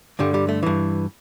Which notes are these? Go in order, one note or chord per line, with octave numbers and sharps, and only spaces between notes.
G2 D3 G3
G3
A3
G2 E3